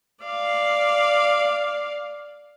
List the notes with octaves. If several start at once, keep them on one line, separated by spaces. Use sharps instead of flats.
D5 F5